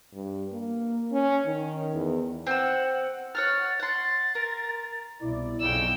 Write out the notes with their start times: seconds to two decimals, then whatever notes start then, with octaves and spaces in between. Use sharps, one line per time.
0.13 G2
0.52 A#3
1.12 C#4
1.46 D#3
1.95 E2
2.47 C4 F#5 E6
3.35 C#5 F#5 F6 A6
3.80 F#5 C6 A6
4.35 A#4
5.21 C2 B2 E4 D5
5.61 F#1 B1 F2 C#3 D#4 G5 E6